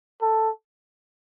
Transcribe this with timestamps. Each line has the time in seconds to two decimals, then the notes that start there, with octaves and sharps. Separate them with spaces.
0.21 A4